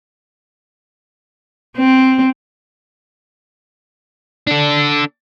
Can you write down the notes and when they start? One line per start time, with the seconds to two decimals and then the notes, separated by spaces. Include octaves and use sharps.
1.77 C4
4.47 D4 A4